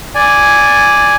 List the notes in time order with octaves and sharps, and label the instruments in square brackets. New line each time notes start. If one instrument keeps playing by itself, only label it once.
[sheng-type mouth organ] D5 G#5